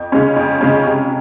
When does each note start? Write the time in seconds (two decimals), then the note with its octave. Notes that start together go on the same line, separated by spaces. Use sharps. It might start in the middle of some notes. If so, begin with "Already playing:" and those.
Already playing: F2
0.12 C#3 G#3 C#4
0.36 F2
0.61 C#3 G#3 C#4
0.86 C3